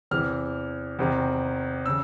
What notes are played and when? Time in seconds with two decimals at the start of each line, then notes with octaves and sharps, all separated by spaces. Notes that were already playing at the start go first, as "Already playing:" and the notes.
0.11 E2 C3 E3 F6
0.99 E2 C3 D#3
1.86 C#3 E6